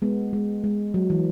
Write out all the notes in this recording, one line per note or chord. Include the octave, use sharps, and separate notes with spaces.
G#3 B3
G#3
G#3
F#3
E3